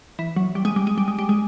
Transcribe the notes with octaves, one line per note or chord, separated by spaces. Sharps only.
E3
F#3
G3
G#3
G3
G#3
G3
G#3
G3
G#3